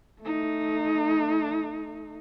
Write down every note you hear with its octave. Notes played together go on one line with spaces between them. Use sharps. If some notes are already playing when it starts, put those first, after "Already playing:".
A3 D#4